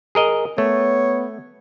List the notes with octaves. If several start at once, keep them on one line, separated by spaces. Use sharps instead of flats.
G#4 A#4 D#5
A3 B3 C#5